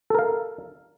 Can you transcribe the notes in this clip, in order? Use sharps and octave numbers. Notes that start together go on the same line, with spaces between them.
A4 A#4 F5